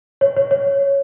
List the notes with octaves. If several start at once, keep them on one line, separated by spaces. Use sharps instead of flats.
C#5
C#5
C#5